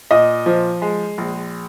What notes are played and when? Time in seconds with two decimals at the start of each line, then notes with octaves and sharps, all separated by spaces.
0.11 A#2 D#5
0.46 F3
0.82 G#3
1.18 A#1